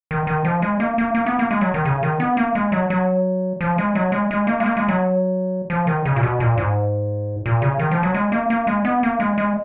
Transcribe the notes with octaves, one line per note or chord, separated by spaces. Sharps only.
D#3
D#3
F3
G#3
A#3
A#3
A#3
B3
A#3
G#3
F#3
D#3
C#3
D#3
B3
A#3
G#3
F#3
F#3
F3
G#3
F#3
G#3
G#3
A#3
G#3
A#3
G#3
F#3
F3
D#3
C#3
A#2
B2
A#2
G#2
A#2
C#3
D#3
F3
F#3
G#3
A#3
A#3
G#3
B3
A#3
G#3
G#3